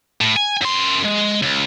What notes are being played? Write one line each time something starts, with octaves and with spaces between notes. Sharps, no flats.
A2
G#5
F#2 C6
G#3
C#2